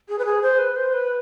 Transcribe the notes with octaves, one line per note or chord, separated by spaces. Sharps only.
G#4
B4
G#4
C5
B4
C5
B4